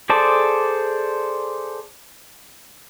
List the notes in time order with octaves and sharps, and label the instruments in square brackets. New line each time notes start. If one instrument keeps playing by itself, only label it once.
[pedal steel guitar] G#4 A4 C5 D5 A5